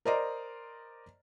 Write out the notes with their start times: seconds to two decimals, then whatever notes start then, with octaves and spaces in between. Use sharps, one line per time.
0.05 A#4 C5 D5 D#5 A#5 C6